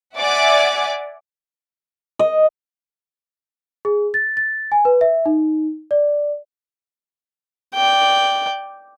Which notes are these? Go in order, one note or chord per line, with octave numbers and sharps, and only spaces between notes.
D5 E5 F#5 G#5 D6
D#5
G#4
A6
A6
G#5
B4
E5
D#4
D5
D5 G5